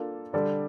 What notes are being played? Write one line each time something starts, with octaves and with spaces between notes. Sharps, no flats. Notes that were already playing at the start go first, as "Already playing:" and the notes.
Already playing: A#3 D4 F4 A4
D3 G3 D4 A4 D5